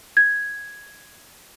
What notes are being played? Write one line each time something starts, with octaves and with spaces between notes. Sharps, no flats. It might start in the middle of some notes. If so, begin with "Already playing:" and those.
G#6